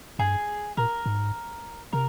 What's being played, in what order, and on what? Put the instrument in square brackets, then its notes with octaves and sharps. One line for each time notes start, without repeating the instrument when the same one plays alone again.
[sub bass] G2 [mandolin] G#4
[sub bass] A#2 [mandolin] A#4
[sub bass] G#2
[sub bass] C3 [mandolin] A#4